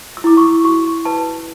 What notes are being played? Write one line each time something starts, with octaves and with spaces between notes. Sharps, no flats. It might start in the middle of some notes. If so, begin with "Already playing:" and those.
E6
E4 D6
C#6
F#4 C#6
B4 A5